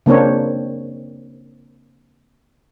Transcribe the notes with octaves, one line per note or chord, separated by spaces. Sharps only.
C#3 A#3 C4 D4 C#5